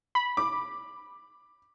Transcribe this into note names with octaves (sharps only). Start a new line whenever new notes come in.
B5
D6